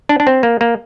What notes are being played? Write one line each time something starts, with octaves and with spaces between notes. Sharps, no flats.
D4
D4
C4
A#3
A#3